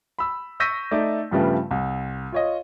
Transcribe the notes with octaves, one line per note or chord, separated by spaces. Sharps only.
B5 E6
C#6 E6 G6 A#6 B6 D#7
A3 D#4 D5
G2 C#3 F3 G3 A3 B3
C2
F4 C#5 D#5